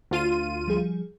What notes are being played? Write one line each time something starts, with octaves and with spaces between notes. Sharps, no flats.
D2 F4 D#7
F3 G3 G#4